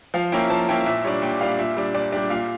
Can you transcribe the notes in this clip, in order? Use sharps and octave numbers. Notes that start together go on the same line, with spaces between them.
F3 F5
A#3 C#4 E4 G5
F3 A5
A#3 C#4 E4 G5
A#2 E5
G3 D4 C#5
A#2 G5
G3 D4 F5
A#2 E5
G3 D4
A#2 D5
G3 D4 G4
A#2 F5